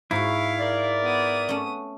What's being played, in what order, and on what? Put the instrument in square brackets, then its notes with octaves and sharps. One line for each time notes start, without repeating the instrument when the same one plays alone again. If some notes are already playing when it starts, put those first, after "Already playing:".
[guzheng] G#2 F#4 [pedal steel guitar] E4 [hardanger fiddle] F5
[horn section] A#4 D5
[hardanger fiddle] B3 D#6
[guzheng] A3 C#4